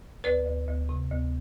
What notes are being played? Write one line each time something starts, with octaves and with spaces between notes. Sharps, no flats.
D2 B4 D5
D2
D2
C3
D2